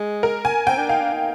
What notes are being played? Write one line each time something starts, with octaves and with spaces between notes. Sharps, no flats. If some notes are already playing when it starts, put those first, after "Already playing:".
Already playing: G#3
A#4
G#5
C4 G5
D4
D#4 F5
D4
D#4